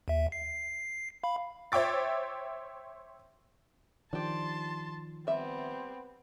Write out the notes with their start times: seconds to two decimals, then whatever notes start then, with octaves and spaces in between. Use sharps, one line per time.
0.08 D#2 E5
0.32 C7
1.24 F5 B5
1.72 C5 C#5 E5 G5 D6 A6
4.13 D#3 F3 D4 G4 A5 C6
5.27 G3 B3 C4 E5